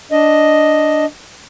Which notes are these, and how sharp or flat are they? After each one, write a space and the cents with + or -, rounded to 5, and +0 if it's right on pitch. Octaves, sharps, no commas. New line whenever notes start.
D4 +0 D#5 +0